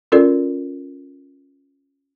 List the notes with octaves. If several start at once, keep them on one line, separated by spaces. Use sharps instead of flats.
C#4 F4 A4 A#4 D5